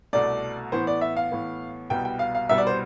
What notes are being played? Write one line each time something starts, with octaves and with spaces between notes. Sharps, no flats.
C2 B2 A3 D5
A2 E3 B3 C5
D5
E5
F5
A2 E3 B3
C2 B2 G3 B3 G5
G5
F5
F5
C2 B2 G3 B3 E5
D5
C5